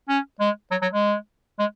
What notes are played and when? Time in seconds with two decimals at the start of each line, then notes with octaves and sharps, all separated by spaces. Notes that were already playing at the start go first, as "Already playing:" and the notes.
0.09 C#4
0.40 G#3
0.71 F#3
0.82 F#3
0.92 G#3
1.59 G#3